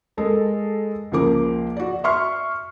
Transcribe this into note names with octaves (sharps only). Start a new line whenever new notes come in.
G#3 A4 A#4
C#2 F3 A#3 D6
F#4 D5
E5 C6 C#6 F6